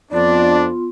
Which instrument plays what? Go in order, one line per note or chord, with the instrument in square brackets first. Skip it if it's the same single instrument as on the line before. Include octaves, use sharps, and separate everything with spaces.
[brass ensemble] F2 D4 [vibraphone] B3 F4 C6 [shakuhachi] D5